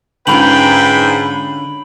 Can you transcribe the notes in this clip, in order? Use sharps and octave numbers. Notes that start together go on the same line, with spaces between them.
G#2 D3 C#4 F4 B4 G5 B5 F#7